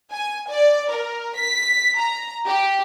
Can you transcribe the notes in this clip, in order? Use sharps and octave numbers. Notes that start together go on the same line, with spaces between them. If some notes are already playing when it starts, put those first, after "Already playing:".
G#5
D5
A#4
B6
A#5
G4